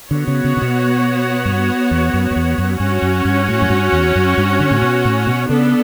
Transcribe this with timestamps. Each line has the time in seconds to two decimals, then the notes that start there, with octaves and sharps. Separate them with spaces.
0.11 D3 B3 F#4 C#5
0.28 C#3
0.45 C#3
0.57 C#3
0.62 B2
1.45 G2
1.91 E2
2.14 F#2
2.31 F#2
2.36 E2
2.58 F#2
2.80 G2 C#4 F#4 C#5
3.02 F#2
3.25 G2
3.48 A2
3.62 F#2
3.70 G2
3.92 E2
4.16 F#2
4.38 G2
4.60 D3
4.71 A2
4.82 B2
5.05 A2
5.27 B2
5.49 C#3 B3 D4 A4